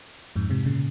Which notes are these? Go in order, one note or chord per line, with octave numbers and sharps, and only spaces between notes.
F2 G#2
G#2 C3
A#2 C#3